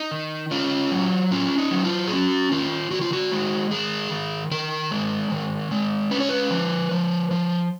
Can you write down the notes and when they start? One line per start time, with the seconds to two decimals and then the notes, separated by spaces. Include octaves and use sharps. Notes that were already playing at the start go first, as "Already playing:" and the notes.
Already playing: D#4
0.11 D#3
0.51 C#4 F4
0.92 F#3
1.31 C#4 F4
1.58 D#4
1.71 F#3
1.85 F4
2.07 G#4
2.12 C#4 F#4
2.51 D#3 F4
2.91 D#3 F#4
3.01 F4
3.13 F#4
3.32 G#3
3.71 D#3 G#4
4.11 D#3
4.51 D#3 A#4
4.91 G#3
5.31 D#3
5.71 G#3
6.11 C#4 B4
6.20 C#5
6.29 B4
6.51 F3
6.91 F3
7.31 F3